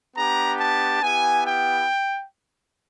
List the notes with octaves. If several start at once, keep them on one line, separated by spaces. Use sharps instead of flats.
B3 D4 G4 A#5
A5
B3 E4 G4 G#5
G5